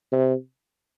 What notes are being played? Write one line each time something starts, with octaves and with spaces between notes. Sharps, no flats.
C3